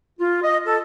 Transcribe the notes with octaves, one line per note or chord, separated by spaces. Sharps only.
F4
D#5
A4